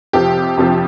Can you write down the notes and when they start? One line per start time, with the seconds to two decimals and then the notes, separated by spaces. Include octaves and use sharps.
0.13 F2 C3 F3 G4
0.57 F2 C3 F3